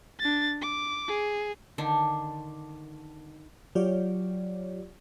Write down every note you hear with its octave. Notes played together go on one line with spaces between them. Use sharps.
D4 A6
D6
G#4
D3 D#3 D4
F#3 F4 G4 C#5 D5